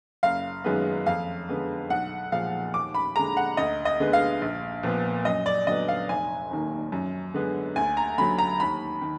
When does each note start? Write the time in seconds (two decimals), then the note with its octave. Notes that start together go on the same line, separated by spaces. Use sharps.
0.23 F#1 F5
0.64 F#2 D#3 G#3 B3
1.06 F2 F5
1.49 D3 G#3 B3
1.90 B1 F#5
2.32 A#2 F3 G#3 F5
2.74 D#2 D6
2.94 B5
3.16 D3 G#3 A#5
3.37 F#5
3.57 D2 D#5
3.85 D#5
4.00 D3 G#3 B3
4.13 F5
4.42 A#1
4.83 A#2 F3 B3
5.25 F#2 D#5
5.46 D5
5.67 D3 F#3 B3 D#5
5.88 F5
6.09 F1 G#5
6.51 D#2 D#3 A#3
6.92 F#2
7.34 D3 G#3 B3
7.76 D2 G#5
7.97 A#5
8.18 D3 F#3 B5
8.39 A#5
8.60 D#2 B5
9.02 D#3